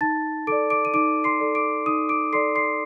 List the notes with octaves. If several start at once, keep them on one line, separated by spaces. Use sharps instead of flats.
D#4 A5 A6
A4 D5 D6 D7
D6 D7
D#7
D#4 D6 D7
C6 C7
A4 D5
D6 D7
D#4 D#6 D#7
D6 D7
A4 D5 C6 C7
C6 C7